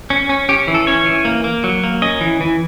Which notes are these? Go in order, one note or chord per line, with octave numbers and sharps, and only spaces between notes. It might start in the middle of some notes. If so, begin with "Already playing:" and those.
C#4
C#4
C#4 G4
E3
A4
C#4 C#5
E3
A#3
A#3
F#3
A#3
C#4 D#5
E3
E3